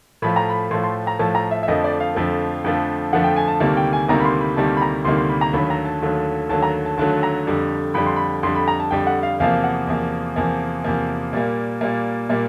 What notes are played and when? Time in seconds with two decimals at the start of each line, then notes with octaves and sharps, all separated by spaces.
0.22 A2 F3 A3 B5
0.36 A#5
0.49 B5
0.71 A2 F3 A3 C6
0.84 C6
1.07 A#5
1.19 A2 F3 A3 A5
1.35 A#5
1.51 E5
1.63 E5
1.68 F2 D3 F3 A3 D#5
1.84 D5
2.00 F5
2.15 F2 D3 F3 A3
2.64 F2 D3 F3 A3
3.13 F2 D3 F3 A3 F#5
3.24 G5
3.36 G#5
3.48 A5
3.60 D2 C3 D#3 G3 A#3 A5
3.77 G5
3.93 G#5
4.09 D2 C3 D#3 G3 A#3 A#5
4.20 B5
4.25 C6
4.41 B5
4.56 D2 C3 D#3 G3 A#3 A5
4.77 B5
4.82 A#5
5.05 D2 C3 D#3 G3 A#3 C6
5.17 C6
5.29 B5
5.41 A#5
5.53 D#2 D3 F#3 A3 B5
5.70 A#5
5.85 A5
6.02 D#2 D3 F#3 A3
6.49 D#2 D3 F#3 A3 A5
6.62 A#5
6.86 A5
6.98 D#2 D3 F#3 A3 A5
7.23 A#5
7.47 F2 D3 G3
7.94 F2 D3 G3 B5
8.06 C6
8.16 B5
8.43 F2 D3 G3 C6
8.55 B5
8.68 A#5
8.80 A5
8.91 F2 D3 G3 G5
9.07 F#5
9.23 F5
9.40 E2 C3 F3 A#3 F5
9.64 F#5
9.87 E2 C3 F3 A#3
10.36 E2 C3 F3 A#3
10.84 E2 C3 F3 A#3
11.33 A#2 G3 A#3
11.81 A#2 G3 A#3
12.29 A#2 G3 A#3